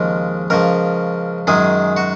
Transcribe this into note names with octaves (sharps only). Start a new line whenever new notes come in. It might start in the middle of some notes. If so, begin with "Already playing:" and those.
Already playing: D#2 C#3 F3 G#3 A#4
C#2 C#3 F3 A#4
F#2 D#3 G#3 G#4
F#4